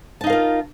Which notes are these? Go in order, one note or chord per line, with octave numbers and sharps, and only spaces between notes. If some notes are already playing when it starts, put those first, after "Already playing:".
D#4 F4 A#4 F5 A5